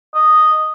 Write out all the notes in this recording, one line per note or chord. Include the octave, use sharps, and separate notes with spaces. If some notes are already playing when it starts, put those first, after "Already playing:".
D#5